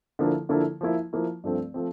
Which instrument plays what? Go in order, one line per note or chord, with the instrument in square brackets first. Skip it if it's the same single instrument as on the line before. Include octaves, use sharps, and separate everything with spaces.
[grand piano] D3 F3 A#3 E4 A4
D3 F3 A#3 E4 A4
F3 A#3 E4
F3 A#3 E4
G2 F3 A3 C4
F3 A3 C4